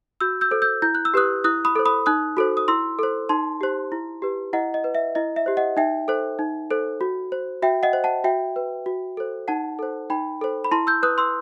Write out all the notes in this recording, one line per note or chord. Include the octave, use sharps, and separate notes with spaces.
F#4 E6 G6
E6 G6
A4 C5
E6 G6
E4 G6
F#6
E6
G4 B4 D#6 F#6
E4 D#6 F#6
B5 D#6
A4 C5
B5 D#6
D#4 D#6 F#6
F#4 A4 C5
D#6
E4 C6 E6
A4 C5
D#4 A5 C6
G4 C5
E4
G4 B4
E4 D#5 F#5
D#5
B4
E5
E4 D#5
E5
G4 C5
D#5 F#5
D#4 E5 G5
A4 C5
D#4
A4 C5
F#4
C5
F#4 E5 G5
D#5 F#5
C5
F#5 A5
F#4 E5 G5
B4
F#4
A4 C5
D#4 F#5 A5
A4 C5
D#4 G5 B5
A4 C5
B5
E4 A5 C6
E6 G6
B4 D#6 F#6
C6 E6